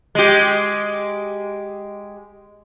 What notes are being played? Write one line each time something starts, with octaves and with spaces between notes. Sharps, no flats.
G#3 G4